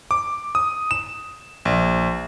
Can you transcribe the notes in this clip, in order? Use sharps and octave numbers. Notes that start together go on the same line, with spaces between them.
D6
D#6
E7
A#1